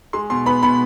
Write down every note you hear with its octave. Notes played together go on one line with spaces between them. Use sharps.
G#3 C6
B2 C6
B3 B5
B2 B5